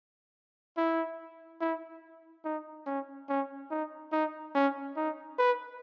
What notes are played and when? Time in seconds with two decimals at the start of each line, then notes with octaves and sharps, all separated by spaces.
0.77 E4
1.61 E4
2.44 D#4
2.86 C#4
3.29 C#4
3.70 D#4
4.12 D#4
4.55 C#4
4.96 D#4
5.39 B4